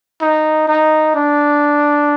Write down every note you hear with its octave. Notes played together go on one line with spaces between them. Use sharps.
D#4
D#4
D4